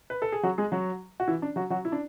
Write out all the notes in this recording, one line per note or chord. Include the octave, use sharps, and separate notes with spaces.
B4
A4
G#4
F#3 F#4
G#3 G#4
F#3 F#4
F#4
E3 E4
D4
F#3 F#4
F#3 F#4
E4
D4